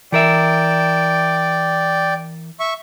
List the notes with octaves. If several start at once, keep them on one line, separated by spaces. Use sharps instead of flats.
E3 A#4 D5 E5 G5
E5 C#6